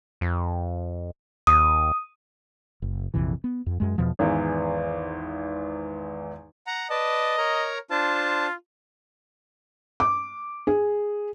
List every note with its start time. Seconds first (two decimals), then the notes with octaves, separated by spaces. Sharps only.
0.21 F2
1.47 D#2 D#6
2.82 F#1
3.14 A#1 F2 C3 E3
3.44 B3
3.66 F2
3.80 F#2 G#3
3.98 E2 B2 F3
4.19 G#1 E2 E3
6.67 F#5 A#5
6.90 B4 D5 D#5 A5
7.38 A#4 C#5 A#5
7.91 D4 F4 C5 A5
10.00 D6
10.67 G#4